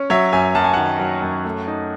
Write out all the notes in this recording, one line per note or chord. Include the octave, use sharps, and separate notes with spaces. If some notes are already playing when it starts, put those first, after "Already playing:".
Already playing: C#4
F#3 C#5 E5
F#2 E5 G#5
F#2 A5
G#5
D#3 F#5 A5
F#3
F#2
A3
D#4